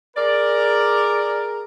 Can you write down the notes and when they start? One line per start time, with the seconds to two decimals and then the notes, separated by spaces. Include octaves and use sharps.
0.17 G#4 A#4 D5